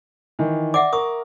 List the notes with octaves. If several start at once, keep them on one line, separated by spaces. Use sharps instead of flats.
D#3 E3
D5 E5 F#5 D6
A#4 C#6 D#6